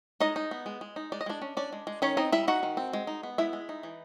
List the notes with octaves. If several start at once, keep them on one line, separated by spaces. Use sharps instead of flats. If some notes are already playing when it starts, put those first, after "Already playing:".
G#3 D#4 D#5
D#4
B3
G#3
G#3
D#4
G#3 D5
D#5
G#3 D4 D5
C#4
C#4 D4 D5
G#3
G#3
D#3 C#4 C#5
C4 D#4 D#5
G3 E4 E5
D#4 F#4 F#5
D#3
C4
G#3
D#4
B3
G#3 E4 E5
G#3
D#4
E3